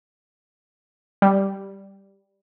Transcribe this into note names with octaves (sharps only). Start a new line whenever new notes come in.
G3